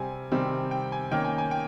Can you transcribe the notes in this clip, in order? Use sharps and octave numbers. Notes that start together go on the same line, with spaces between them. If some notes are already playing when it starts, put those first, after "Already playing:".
Already playing: C3 G3 C4 G#5
C3 D#3 G3 C4
G5
G#5
D#3 A#3 C#4 G5
G#5
G#5
G5